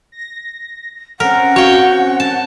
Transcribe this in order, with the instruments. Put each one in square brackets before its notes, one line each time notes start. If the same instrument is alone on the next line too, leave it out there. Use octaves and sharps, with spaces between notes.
[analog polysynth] A#6
[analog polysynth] C4 C#4 [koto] A#4 [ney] F#5
[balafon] F#4 F5 [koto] C#5 G5
[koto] A5